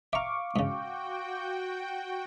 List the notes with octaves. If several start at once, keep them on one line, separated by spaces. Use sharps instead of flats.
E5 F5 A#5 C#6 D6
G#2 C#3 F#4 G5